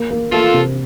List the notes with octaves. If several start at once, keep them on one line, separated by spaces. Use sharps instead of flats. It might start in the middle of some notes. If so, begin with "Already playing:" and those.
Already playing: A#3
A#3
A#3 F4 A4
C3